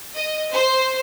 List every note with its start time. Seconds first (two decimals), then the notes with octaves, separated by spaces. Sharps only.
0.15 D#5
0.52 C5